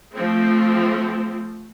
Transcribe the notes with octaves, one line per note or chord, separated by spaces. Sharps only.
F3 A3 C4